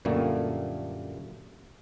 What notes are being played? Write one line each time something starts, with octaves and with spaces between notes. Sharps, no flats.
F#2 A#2 D3 G3 A3 A#3